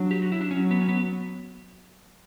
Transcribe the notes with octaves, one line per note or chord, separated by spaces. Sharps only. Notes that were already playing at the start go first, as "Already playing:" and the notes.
Already playing: F#3 D4
G4
F#4
E4
D4
F#3 C#4
B3
C#4
B3